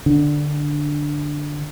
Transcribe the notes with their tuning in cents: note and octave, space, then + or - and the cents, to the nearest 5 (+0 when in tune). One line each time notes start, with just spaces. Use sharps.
D3 +5 D4 +0